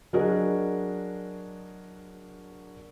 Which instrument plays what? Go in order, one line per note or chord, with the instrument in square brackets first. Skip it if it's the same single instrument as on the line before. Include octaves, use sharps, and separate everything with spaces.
[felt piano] F#3 D4 F#4 G#4 A#4 D#5